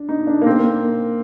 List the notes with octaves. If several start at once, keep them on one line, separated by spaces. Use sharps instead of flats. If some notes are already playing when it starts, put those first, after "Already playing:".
Already playing: D4
D#4
D4
A#3
C4
A#3